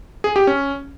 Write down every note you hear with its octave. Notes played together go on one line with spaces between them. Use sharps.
G#4
G4
C#4